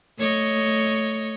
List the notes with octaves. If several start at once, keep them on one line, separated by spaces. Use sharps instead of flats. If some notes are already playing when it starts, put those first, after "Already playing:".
A3 C#5 D#5